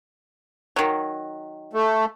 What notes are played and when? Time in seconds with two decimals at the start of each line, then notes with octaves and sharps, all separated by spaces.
0.76 D#3 F#3
1.73 A3